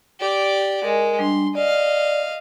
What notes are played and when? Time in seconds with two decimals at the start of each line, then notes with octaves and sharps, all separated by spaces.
0.20 G4 D5
0.84 G#3 A#4
1.19 G3 D4 C6
1.55 D5 D#5 F5